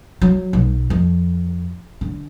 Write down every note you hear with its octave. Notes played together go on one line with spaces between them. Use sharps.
F#3
B1
F2
D3